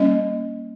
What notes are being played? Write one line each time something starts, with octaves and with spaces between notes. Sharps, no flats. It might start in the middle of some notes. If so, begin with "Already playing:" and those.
Already playing: G3 A#3 C#4 D#5